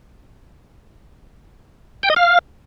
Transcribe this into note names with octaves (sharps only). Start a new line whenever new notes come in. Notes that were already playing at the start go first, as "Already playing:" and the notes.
G5
D#5
F5